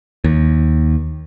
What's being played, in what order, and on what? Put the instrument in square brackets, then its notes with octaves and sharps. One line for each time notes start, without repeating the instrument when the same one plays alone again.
[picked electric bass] D#2